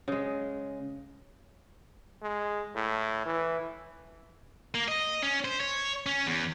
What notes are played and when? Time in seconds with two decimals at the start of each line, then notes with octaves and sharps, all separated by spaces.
0.08 C#3 G#3
2.22 G#3
2.75 A2
3.25 E3
4.75 A#3
4.88 D#5
5.23 C#4
5.45 C5
5.60 C#5
6.06 C#4
6.27 E2